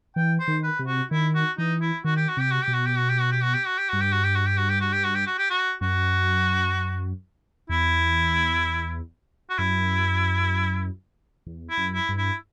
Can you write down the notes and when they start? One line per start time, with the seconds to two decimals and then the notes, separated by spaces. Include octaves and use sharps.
0.16 E3 G5
0.40 C5
0.48 D#3
0.63 B4
0.79 C3
0.87 F#4
1.11 D#3 E4
1.35 F#4
1.58 E3 D#4
1.81 E4
2.04 D#3 F#4
2.16 G4
2.29 F#4
2.37 C3 G4
2.51 F#4
2.63 B2 G4
2.74 F#4
2.86 G4
2.98 F#4
3.09 G4
3.20 F#4
3.32 G4
3.43 F#4
3.54 G4
3.66 F#4
3.78 G4
3.89 G2 F#4
4.01 G4
4.12 F#4
4.24 G4
4.35 F#4
4.46 G4
4.58 F#4
4.69 G4
4.81 F#4
4.93 G4
5.04 F#4
5.15 G4
5.27 F#4
5.38 G4
5.50 F#4
5.81 F#2 F#4
7.69 E2 E4
9.50 F#4
9.58 F#2 E4
11.47 E2
11.70 E4
11.78 F#2
11.94 E4
12.09 G2
12.18 E4